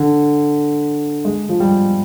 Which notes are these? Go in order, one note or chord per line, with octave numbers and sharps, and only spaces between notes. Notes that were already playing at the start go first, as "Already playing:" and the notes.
Already playing: D3
G#3
F3
G3